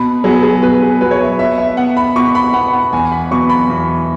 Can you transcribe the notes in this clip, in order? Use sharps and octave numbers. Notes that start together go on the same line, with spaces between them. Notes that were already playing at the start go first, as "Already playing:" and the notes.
Already playing: B2 B5
F#3 B3 G#4
G#4
B2 B4
G#4
F#3 B3 B4
C#5
E5
B2 E5
E5
B3 F#5
B5
B2 C#6
B5
B3 F#5
F#5
E2 G#5
B5
B2 F#3 B3 C#6
B5
E2